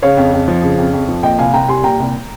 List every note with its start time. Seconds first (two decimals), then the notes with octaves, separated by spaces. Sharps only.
0.02 C#3 C#5 F5
0.17 F2
0.33 F2
0.48 F3
0.63 C#3
0.78 F2
0.93 F2
1.08 F3
1.23 A#2 D#5 G5
1.38 C2 F5 G#5
1.54 C2 G5 A#5
1.68 G3 G#5 C6
1.84 A#2 G5 A#5
2.00 C2